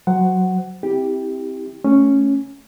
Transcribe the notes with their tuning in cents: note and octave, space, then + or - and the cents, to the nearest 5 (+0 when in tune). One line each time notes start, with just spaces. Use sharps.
F#3 +0 C5 -5 F#5 +10
C4 +0 E4 -20 G4 +0
A3 +0 C#4 +0